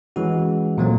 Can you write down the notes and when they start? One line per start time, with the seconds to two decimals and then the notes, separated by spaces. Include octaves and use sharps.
0.16 E3 G#3 C#4 F#4
0.78 A#2 F#3 A3 C4